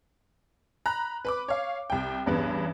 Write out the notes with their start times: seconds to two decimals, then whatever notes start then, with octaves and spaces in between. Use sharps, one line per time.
0.86 A#5 B5 F#6
1.25 B4 B5 D6
1.48 C#5 F5
1.90 C2 G5
2.26 A1 E2 G2 B3 B4